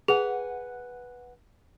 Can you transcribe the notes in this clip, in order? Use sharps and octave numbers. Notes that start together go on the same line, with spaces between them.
G#4 B4 F#5 G#5